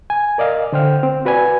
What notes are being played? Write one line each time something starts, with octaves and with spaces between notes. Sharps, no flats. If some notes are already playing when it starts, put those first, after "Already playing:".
G#5
A#4 D5 D#5 F5
D3 C5 G5 F6
C4
F#4 B4 D5 G#5